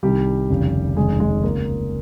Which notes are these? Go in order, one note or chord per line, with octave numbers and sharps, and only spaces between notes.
C2 C3 D#3 G3 G4
F1 D#2 C#3
F1 D#2 C#3 G#3 G#4
G#3 G#4
C#2 C#3 A#3 A#4